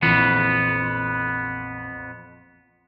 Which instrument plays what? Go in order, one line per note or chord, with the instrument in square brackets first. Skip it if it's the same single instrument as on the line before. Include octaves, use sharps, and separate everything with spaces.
[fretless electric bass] A#1 E3 [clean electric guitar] F2 B3